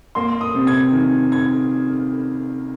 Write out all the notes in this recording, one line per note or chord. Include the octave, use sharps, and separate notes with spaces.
A#3 C6
D#6
C3
G#6
D#3
G#6